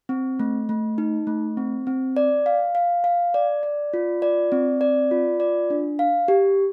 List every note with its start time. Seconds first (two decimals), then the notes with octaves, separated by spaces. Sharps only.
0.09 C4
0.39 A3
0.69 A3
0.98 D#4
1.27 A3
1.57 C4
1.87 C4
2.17 D5
2.46 F5
2.75 F5
3.04 F5
3.34 D5
3.63 D5
3.94 F4
4.22 D5
4.52 C4
4.81 D5
5.11 F4
5.40 D5
5.70 D4
5.99 F5
6.28 G4